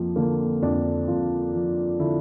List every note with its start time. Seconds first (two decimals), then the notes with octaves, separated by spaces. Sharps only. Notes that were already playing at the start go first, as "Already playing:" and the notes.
Already playing: F2 F3 A#3
0.16 D3 A#3
0.62 F2 D4
1.08 F2 F4
1.53 F3
1.99 D3 E4